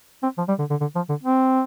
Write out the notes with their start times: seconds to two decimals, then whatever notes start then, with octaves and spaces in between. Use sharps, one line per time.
0.23 C4
0.38 F3
0.48 G3
0.59 D3
0.70 D3
0.81 D3
0.95 F3
1.09 D3
1.23 C4